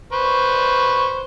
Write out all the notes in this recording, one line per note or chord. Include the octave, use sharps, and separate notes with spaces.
B4 C5 C#6